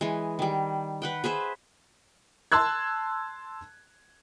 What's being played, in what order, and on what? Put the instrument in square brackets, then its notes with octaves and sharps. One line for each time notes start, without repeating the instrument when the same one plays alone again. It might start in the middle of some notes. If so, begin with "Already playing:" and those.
[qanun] E3 G#3
D#3 G3
B4 F#5 G5
G#4 B4 C5 E5
[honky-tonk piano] A5 C6 E6 F#6 G#6